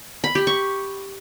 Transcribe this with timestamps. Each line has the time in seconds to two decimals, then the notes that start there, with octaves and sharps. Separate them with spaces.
0.24 B5
0.35 G4
0.47 C#6